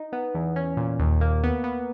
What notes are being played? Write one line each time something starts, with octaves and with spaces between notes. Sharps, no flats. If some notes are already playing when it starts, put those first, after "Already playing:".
Already playing: D#4
B3
E2
C#4
A#2
D#2
A#3
B3
B3